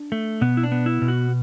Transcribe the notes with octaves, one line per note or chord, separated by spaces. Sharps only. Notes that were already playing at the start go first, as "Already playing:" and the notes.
Already playing: D4
A3
B2 B3
E4
D4
B3
E4
B2
F#4